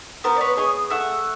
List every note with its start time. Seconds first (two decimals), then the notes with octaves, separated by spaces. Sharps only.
0.24 B3 A#4 C5
0.36 D5
0.41 B4 C#5
0.57 G#4 C#5 D#5
0.90 A3 E5 F#5